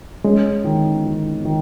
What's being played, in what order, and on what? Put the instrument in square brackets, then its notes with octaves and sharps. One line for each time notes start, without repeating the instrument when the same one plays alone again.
[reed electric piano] G#3 [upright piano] C#4
[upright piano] D#3
D#3
D#3